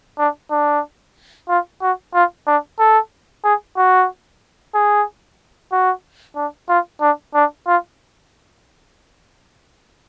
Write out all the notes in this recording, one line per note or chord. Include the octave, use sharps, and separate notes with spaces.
D4
D4
F4
F#4
F4
D4
A4
G#4
F#4
G#4
F#4
D4
F4
D4
D4
F4